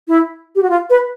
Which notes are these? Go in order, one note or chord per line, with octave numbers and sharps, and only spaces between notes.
E4
G4
F#4
F4
B4